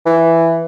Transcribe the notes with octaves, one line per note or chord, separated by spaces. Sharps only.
E3